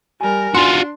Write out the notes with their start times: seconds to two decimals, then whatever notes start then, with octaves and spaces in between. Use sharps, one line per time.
0.21 G3 A#4 G#5
0.55 D4 F4 F#4 C6